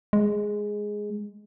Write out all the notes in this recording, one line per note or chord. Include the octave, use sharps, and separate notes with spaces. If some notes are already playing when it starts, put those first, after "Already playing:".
G#3